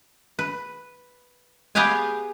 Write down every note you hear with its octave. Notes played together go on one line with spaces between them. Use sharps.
B4
B3 G4 G#4 B4 F5 G#5